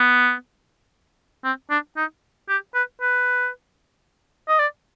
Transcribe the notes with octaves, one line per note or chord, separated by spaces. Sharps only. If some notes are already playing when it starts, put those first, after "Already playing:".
Already playing: B3
C4
D4
D#4
G4
B4
B4
D#5
D5